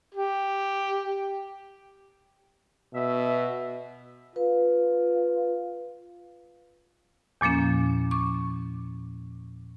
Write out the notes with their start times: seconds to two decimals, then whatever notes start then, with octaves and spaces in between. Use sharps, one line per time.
0.15 G4
2.94 B2 E5
4.36 F4 B4
7.41 E2 A#2 F3 A#3 C#4
8.11 C#6 D6